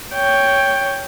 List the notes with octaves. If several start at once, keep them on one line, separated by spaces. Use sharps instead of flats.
C#5 G5